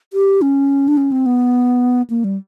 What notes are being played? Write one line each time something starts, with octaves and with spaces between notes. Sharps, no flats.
G4
C#4
D4
C#4
C4
B3
A#3
G3